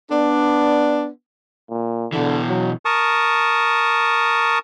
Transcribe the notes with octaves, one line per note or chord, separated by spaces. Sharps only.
B3 D4
A#2
B2 D3 E3
F#3
A#4 A5 C#6 D#6